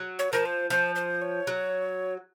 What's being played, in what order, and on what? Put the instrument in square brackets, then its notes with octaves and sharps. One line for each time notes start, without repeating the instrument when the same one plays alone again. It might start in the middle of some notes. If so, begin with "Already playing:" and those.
Already playing: [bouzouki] F#3
[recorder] C#5
[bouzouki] F3 [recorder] A#4
[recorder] C5
[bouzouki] F3 [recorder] C5
[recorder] C5
C#5
[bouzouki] F#3